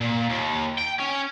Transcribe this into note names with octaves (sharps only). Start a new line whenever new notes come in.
A#2
D#2
G5
C#4